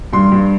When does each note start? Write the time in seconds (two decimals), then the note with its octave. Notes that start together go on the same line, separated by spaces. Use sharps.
0.13 G2 C6
0.32 G2